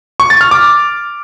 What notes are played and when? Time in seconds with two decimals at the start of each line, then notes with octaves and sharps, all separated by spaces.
0.20 C#6
0.30 A6
0.41 F6
0.51 D6